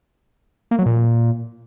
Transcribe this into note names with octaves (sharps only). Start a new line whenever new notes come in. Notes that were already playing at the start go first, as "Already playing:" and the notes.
A#3
F#3
A#2